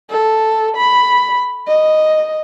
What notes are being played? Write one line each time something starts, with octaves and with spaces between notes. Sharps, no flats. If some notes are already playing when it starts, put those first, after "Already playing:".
A4
B5
D#5